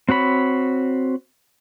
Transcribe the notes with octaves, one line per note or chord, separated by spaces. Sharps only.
C4 F#4 C#5 B5